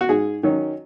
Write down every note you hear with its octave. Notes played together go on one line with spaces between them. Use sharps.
F#4
G#2 G#4
D#3 F#3 C#4